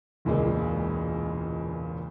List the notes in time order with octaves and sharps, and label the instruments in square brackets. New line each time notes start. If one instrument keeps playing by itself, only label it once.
[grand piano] E1 C#2 A#2 G#3